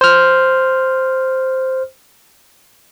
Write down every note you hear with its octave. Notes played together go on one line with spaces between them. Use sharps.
C5 F6